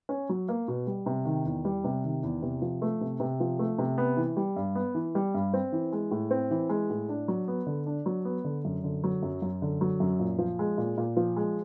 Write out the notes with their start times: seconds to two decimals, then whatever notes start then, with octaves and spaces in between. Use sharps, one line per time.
0.09 C#4
0.29 F#3
0.49 A#3
0.68 B2
0.87 G3
1.06 C3
1.25 D#3
1.45 E2
1.65 G3
1.84 C3
2.04 D#3
2.23 E2
2.42 C3
2.62 F3
2.82 A3
3.01 C3
3.20 C3
3.40 F3
3.59 A3
3.78 C3
3.98 B3
4.17 E3
4.37 G3
4.56 G2
4.75 B3
4.95 E3
5.15 G3
5.35 G2
5.54 C4
5.72 E3
5.93 G#3
6.11 A2
6.31 C4
6.51 E3
6.69 G#3
6.90 A2
7.09 D4
7.28 F#3
7.48 B3
7.66 D3
7.87 D4
8.06 F#3
8.25 B3
8.44 D3
8.65 F#2
8.84 D3
9.04 F#3
9.23 F#2
9.42 F#2
9.62 D3
9.81 F#3
10.00 F#2
10.19 A#2
10.38 F3
10.59 G#3
10.78 A#2
10.98 A#2
11.17 F3
11.37 G#3